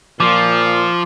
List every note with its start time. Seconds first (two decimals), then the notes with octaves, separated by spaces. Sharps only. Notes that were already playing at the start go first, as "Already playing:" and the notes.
0.20 A#2 F3 F4 D6